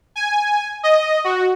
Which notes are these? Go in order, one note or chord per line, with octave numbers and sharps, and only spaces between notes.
G#5
D#5
F#4